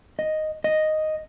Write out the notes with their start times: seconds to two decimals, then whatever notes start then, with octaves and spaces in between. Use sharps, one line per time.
0.19 D#5
0.64 D#5